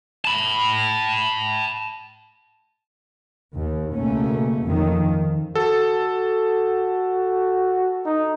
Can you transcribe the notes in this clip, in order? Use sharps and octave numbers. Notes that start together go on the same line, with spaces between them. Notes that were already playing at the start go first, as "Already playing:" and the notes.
A5 B5
D#2
C#2 B2 A3 A#3 C#4
F2 D#3
F#4 A4
D#4